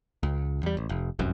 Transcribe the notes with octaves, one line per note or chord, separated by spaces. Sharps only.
C#2
E2 G3
A1
F1
F1 C2 F#2